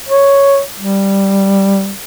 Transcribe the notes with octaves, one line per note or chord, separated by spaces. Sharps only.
C#5
G3